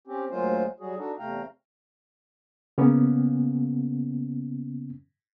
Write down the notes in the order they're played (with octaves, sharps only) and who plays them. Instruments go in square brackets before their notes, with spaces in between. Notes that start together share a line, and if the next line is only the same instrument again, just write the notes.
[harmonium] C4 C#4 G4
D2 F#3 G#3 A#3 F4 C5
F#3 G3 F#4 G#4
D4 D#4 F#4 A4
E2 C3 A3 F5 G5 A#5
[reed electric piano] C#3 A#3 B3 C#4